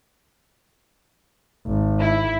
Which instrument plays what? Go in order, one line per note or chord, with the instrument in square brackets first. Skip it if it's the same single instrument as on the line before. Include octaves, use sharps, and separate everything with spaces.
[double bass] G#1
[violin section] E4